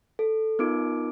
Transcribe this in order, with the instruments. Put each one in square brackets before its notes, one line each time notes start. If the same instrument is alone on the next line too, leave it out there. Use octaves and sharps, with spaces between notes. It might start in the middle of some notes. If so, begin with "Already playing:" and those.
[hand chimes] A4
B3 D#4 F4 A#4 D6 D7